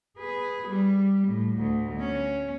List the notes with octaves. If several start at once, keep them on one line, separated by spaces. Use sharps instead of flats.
G#4 B4
G3
A2
D2
C#4